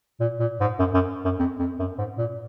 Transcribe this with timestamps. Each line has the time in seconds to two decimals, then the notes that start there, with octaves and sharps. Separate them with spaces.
0.20 A#2
0.40 A#2
0.60 G#2
0.79 F#2
0.94 F#2
1.25 F#2
1.39 F2
1.59 F2
1.79 F#2
1.98 G#2
2.18 A#2